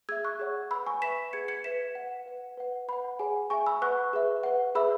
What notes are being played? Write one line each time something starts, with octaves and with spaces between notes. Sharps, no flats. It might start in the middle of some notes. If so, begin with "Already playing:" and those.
G#4 E5 E6 G#6
C#6 F#6
G#4 C#5 F#5
B4 F#5 B5 E6
G#5 C#6
B4 E5 B6 E7
G#4 B4 F#5 G#6 C#7
G#6 C#7
B4 E5 B6 E7
B4 F#5
B4 F#5
B4 F#5
B4 F#5 B5
G#4 C#5 F#5 G#5
G#4 E5 G#5 C#6
B5 E6
B4 F#5 C#6 F#6
G#4 B4 E5
B4 F#5
G#4 B4 E5 B5 E6